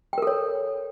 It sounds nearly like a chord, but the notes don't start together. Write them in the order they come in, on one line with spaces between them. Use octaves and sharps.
G5 A#4 A4 C#5